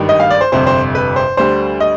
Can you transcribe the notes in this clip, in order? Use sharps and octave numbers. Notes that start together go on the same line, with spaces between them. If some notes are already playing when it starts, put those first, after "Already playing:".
Already playing: G#1 G2 D#3 G3
D#5
F5
D5
C5
G1 F2 C3 C5
C5
B4
C5
D2 D3 G3 C5
D#5